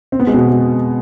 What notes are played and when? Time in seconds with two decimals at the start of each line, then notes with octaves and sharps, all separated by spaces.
0.12 C4
0.20 B3
0.27 G#3
0.34 B2 B3
0.50 G#3